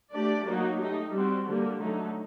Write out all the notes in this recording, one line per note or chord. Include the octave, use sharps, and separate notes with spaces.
A3 D4 G4 D5
F#3 A#3 D#4 F#4
A3 D#4 G4
G3 C4 F#4
D3 G3 A#3
D3 F#3 A3 D#4